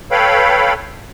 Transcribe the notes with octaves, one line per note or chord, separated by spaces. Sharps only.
A4 B4 C#5 F5 G5 B5